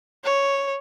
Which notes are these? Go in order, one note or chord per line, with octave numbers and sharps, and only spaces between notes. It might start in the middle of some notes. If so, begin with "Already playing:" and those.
C#5